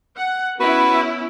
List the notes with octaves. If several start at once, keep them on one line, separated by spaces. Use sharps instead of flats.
F#5
B3 C#4 E4 F#4 B4